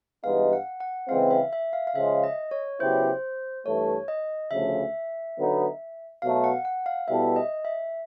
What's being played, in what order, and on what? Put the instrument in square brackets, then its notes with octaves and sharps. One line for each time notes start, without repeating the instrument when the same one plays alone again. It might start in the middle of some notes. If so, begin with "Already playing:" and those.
[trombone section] G2 E3 G#3 B3 D#4 [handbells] F5
[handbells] F#5
F#5
[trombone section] C#3 E3 G#3 C4 [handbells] F5
[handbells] E5
E5
F5
F5
[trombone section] C#3 F3 G#3 [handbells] E5
[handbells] D#5
C#5
[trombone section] C#3 F#3 B3 E4 G4 [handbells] C5
[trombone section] G2 E3 A3 [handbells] C#5
[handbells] D#5
[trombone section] D2 C#3 F3 [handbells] E5
[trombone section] D3 F#3 B3 D#4
[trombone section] B2 F#3 A3 [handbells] F5
[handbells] F#5
F#5
F5
[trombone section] B2 G3 B3 E4 A4 [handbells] E5
[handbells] D#5
E5